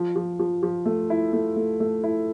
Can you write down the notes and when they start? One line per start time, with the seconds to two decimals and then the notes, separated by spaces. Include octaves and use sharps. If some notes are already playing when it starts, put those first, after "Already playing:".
Already playing: F3
0.16 F3
0.40 F3
0.63 F3
0.86 A3
1.10 E4
1.33 A3
1.56 A3
1.80 A3
2.04 E4